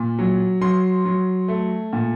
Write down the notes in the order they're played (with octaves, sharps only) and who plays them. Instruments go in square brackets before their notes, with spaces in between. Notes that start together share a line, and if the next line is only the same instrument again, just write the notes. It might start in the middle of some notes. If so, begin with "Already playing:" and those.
Already playing: [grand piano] A#2
F#3
F#3 C6
F#3
A3
A#2